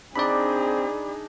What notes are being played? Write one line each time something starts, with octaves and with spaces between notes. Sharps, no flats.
C4 D4 D#4 G#4 D5 B5 D6